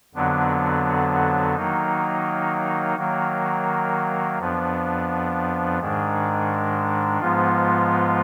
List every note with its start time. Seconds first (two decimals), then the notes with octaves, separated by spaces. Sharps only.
0.14 F2 D3 F#3 B3 D4
1.55 D#3 F#3 A#3 D#4
2.97 D#3 F#3 A#3
4.38 F2 F3 B3 D4
5.80 G#2 D#3 G#3 D4
7.21 G#2 F3 G#3 B3 F4